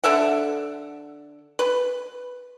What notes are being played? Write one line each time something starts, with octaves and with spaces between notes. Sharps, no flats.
D3 A4 E5 F#5
B4